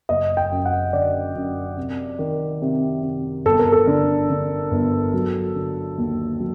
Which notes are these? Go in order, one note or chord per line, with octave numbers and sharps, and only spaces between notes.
F#1 D#5
G5
F#2
F#5
D3 D5
F#2
C3
D#3
C3
C3
G1 A4
A#4
A4
D3
D3
G1
F#3
D3
D#2
F#3